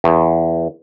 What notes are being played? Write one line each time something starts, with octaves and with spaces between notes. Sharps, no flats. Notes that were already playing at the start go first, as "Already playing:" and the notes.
E2